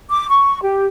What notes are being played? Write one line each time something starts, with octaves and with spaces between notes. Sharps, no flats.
D6
C#6
G4